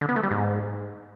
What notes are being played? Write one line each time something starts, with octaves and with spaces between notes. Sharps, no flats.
D3
B3
A3
G3
G#2